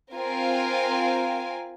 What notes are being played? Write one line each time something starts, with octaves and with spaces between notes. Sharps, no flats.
C4 F4 A#4 F5 G#5